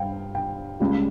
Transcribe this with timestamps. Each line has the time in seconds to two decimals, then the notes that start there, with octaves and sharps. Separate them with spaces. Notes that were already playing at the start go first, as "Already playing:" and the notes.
Already playing: G2 F5 G5
0.35 G5
0.80 C#2 C#3 G3